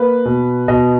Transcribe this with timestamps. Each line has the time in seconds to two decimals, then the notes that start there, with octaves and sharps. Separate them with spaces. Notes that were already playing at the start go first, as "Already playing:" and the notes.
Already playing: A#3 B4
0.25 B2
0.68 B2 D#5